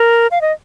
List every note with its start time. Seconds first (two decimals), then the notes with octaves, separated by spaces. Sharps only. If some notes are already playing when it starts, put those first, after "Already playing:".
Already playing: A#4
0.31 F5
0.41 D#5